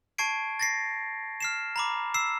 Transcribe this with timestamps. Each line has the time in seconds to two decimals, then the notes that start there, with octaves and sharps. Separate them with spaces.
0.18 A5 C#6 G#6 C7 D7
0.59 A6 A#6 C7
1.40 F6 C7 E7
1.76 A#5 B5 D6
2.14 E6 C7 E7